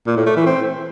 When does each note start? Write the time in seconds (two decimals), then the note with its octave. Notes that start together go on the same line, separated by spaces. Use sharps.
0.07 A#2
0.16 A2
0.26 A3
0.36 E3
0.46 C4